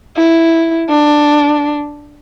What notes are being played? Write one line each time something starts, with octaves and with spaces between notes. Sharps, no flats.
E4
D4